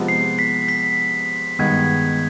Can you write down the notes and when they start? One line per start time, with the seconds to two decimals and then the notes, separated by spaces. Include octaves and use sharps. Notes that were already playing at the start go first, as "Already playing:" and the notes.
Already playing: C3 F3 G#3 B3 D#4
0.08 C7
0.39 B6
0.68 B6
1.59 G2 D#3 G#3 B3 G#6